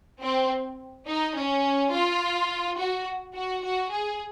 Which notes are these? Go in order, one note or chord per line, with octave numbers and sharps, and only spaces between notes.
C4
D#4
C#4
F4
F#4
F#4
F#4
G#4